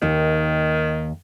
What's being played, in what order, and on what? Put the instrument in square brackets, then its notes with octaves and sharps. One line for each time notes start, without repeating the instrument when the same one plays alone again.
[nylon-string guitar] D#2 D#4 [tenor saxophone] D#3